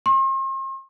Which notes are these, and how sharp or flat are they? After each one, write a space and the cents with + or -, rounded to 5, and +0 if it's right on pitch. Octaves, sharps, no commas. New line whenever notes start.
C6 +45